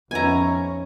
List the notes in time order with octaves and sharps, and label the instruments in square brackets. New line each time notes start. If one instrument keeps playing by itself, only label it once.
[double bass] F2 C#4 [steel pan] B3 D#4 E5 [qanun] G#5 A#5